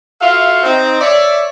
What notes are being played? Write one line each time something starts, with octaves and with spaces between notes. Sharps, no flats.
F4 F#4 A4 E5 F5
C4 D#4
C#5 D5 E5